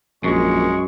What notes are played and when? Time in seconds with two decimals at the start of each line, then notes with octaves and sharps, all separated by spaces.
0.24 A#1 F#2 G#3 C#6